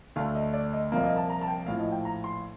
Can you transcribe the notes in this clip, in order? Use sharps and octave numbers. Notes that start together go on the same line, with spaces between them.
D2 D3 A3 F5
D#5
D5
D#5
C2 A#2 F3 A#3 D#5
D#5
A5
A#5
A5
G5
A#1 A2 F3 F5
D#5
G5
A#5
C6